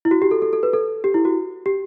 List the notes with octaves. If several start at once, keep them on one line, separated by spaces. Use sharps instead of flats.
E4
F#4
G4
A4
A4
A4
B4
A4
G4
E4
F#4
G4